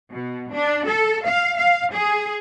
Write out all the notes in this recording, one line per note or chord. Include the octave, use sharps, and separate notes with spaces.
B2
D4
A4
F5
F5
G#4